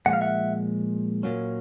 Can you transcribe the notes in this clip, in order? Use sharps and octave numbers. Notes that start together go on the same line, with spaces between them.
A#2 F3 G#3 F#5
F5
E5 F#5
A#2 F#3 A#3 C#4